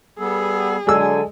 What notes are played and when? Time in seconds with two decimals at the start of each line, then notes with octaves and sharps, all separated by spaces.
0.19 G3 B3 G#4 A4
0.87 D3 F#3 G#3 A4 D5 G#5 E6